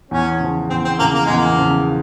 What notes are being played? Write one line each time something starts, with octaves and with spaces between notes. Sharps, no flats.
E2 C#4
C#3 F3
E2 C4
C4
C#3 F3 A#3
A#3
E2 G#3
A#3
C#3 F3